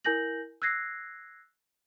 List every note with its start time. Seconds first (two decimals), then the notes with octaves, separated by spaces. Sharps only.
0.05 E4 A#4 G#5 G6 A#6 F#7
0.62 E6 F#6 G#6 A#6 C7